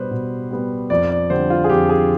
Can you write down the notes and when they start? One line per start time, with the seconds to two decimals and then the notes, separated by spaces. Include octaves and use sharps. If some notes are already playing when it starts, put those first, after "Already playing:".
Already playing: B2 G3 B3 G4 B4 C5
0.11 B2
0.51 G3 B3
0.90 F2 D5
1.10 D5
1.30 D3 G3 C4 C5
1.50 F4
1.64 G#4
1.70 F2 G4
1.89 G#4